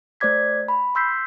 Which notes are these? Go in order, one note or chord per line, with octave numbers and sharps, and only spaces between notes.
A3 C5 D5 D6 G#6 B6
B5
C6 E6 G6 B6 C7